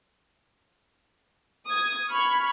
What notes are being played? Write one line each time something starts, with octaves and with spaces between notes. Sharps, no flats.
D#6 G#6
B5 C#6 F6 G#6